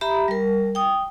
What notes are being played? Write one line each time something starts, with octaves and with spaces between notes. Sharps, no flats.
G4 E5 A#5 B5
G3 A#4
G5 D#6